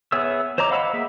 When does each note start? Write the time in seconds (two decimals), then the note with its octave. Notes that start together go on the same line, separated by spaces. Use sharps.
0.12 B3 G#4 C#5 E5 E6
0.58 C5 C#5 D#5 A#5 D6
0.70 D#5 F5 F#5 B5 E6
0.93 A#3 G#4 E5